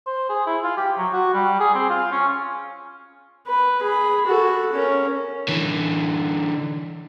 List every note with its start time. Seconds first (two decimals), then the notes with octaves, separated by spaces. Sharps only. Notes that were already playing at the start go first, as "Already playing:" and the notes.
0.06 C5
0.29 G#4
0.46 E4
0.63 F4
0.77 G4
0.98 F#3
1.13 F#4
1.34 G3
1.60 G#4
1.75 C4
1.90 F4
2.12 C#4
3.48 B4
3.83 G#4 B5
4.26 F#4 A4
4.73 C#4 A#4
5.48 D3 E3